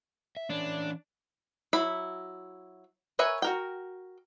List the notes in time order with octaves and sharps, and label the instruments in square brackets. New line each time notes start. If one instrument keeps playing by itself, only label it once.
[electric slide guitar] E5
[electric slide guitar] E3 C#4 C#5 [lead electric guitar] D4
[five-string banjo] F#3 E4 B5
A#4 B4 C#5 E5 G#5
F#4 A#4 G5